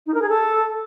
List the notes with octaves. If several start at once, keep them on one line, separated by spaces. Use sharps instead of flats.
D#4
A#4
G#4
A4